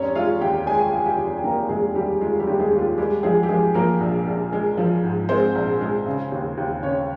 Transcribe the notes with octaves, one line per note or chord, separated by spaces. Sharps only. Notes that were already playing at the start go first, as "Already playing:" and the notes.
Already playing: F1 C#4 C#5
G#3 F4 F5
D#2 G4 G5
G#3 G#4 G#5
G#3
G4 G5
F1
F1 A#3 A#4
F1 G#3 G#4
D#2 G3 G4
G#3 F4
G3 G4
D#2
G#3 G#4
D#2
F4
G3 G#3 G4
F3 G#3 G#4
G4
F3 G#3 G#4
F3 A#3 A#4
A#1
A#1
G#3
F3
G#2
G#3 C4 C5
A#1
G#3
C#3
D#2
D#2
C#3 C#4 C#5